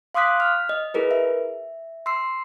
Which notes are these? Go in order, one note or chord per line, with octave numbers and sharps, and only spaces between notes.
F5 C6 D6 D#6 F#6 B6
F6
D#5
E4 G#4 A#4 B4
E5
C6 E6 C7